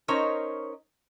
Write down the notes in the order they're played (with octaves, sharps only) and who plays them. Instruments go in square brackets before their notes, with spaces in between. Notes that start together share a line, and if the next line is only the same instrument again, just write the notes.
[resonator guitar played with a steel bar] C#4 D#4 A#4 C5 C#5 D#5